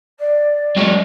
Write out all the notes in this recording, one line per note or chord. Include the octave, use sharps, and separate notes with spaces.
D5
F#3 G#3